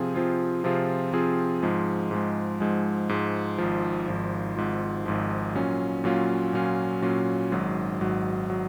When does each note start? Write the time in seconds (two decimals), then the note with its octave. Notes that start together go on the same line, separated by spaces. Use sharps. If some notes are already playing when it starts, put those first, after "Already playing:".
Already playing: C3 F3 C4 F4 G#4
0.14 C3 F3 C4 F4 G#4
0.64 C3 F3 C4 F4 G#4
1.13 C3 F3 C4 F4 G#4
1.62 G#2 F3 G#3
2.11 G#2 F3 G#3
2.60 G#2 F3 G#3
3.09 G#2 F3 G#3
3.58 G#1 G#2 F3
4.08 G#1 G#2 F3
4.56 G#1 G#2 F3
5.06 G#1 G#2 F3
5.55 A#2 F#3 C#4 F4
6.04 A#2 F#3 C#4 F4
6.53 A#2 F#3 C#4 F4
7.02 A#2 F#3 C#4 F4
7.52 G#1 G#2 F#3
8.01 G#1 G#2 F#3
8.50 F#3